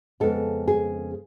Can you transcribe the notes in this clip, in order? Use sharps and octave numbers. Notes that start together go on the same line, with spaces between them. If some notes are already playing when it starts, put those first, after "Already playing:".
F2 C#3 G#3 B3 A4
G#4